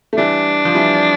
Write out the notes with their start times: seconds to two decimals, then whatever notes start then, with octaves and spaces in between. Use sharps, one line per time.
0.13 A3
0.17 E3 G3 D4
0.65 F3
0.75 E3 G3